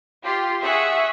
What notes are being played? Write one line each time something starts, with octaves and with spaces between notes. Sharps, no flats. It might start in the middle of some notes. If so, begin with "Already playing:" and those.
F4 G4 C6
G#4 E5 F#5 C#6